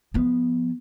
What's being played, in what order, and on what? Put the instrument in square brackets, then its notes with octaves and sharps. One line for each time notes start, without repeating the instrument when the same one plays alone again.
[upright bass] F3 B3